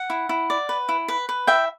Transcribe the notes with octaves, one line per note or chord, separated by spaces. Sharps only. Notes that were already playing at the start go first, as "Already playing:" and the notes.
Already playing: F#5
E4
E4
D5
B4
E4
B4
B4
E4 E5 G5